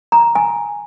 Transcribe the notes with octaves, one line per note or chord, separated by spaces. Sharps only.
A#5
G#5